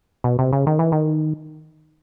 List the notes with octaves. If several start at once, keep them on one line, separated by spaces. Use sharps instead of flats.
B2
C3
C#3
D#3
E3
D#3